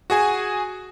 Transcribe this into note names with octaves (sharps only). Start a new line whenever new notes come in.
F#4 G#4 G#5